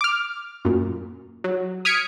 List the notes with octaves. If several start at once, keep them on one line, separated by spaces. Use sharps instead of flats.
D6 F6
F#2 A#2
F#3
D#6 F6 G#6 B6 C#7 D7